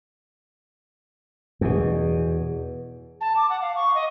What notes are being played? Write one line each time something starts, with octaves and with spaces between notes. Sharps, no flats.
E2 B2
A5
D6
F#5
F5
C#6
D#5